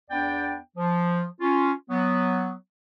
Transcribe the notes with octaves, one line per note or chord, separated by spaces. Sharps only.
E2 B3 D4 D5 G5
F3
C#4 F4
F#3 B3